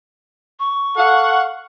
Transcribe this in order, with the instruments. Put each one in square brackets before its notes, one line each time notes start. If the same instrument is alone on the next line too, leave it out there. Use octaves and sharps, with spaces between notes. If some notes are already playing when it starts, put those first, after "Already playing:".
[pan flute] C#6
[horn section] A4 F5 F#5